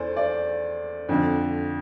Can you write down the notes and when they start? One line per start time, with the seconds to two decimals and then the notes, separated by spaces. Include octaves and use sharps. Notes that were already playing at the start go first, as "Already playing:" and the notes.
Already playing: E2 A4 C5 D5
0.17 D5
1.09 F2 D3